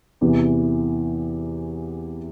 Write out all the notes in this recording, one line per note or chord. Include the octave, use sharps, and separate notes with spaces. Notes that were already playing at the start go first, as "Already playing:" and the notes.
E2 C3 E3